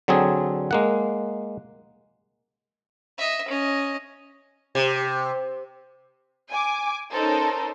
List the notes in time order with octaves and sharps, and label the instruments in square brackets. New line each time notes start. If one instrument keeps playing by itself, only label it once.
[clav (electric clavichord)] D3 F#3 C4 G#4
G#3 A#3 F#5
[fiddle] D#5 E5
C#4 D#5
[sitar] C3
[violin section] G#5 D6
C#4 D#4 A4 A#4 C5